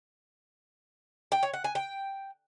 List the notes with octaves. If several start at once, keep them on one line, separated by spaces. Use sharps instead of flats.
G5
C#5
F#5
G#5
G5